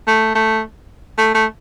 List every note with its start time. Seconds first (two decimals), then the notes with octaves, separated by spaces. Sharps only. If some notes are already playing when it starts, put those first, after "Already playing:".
0.07 A3
0.35 A3
1.18 A3
1.35 A3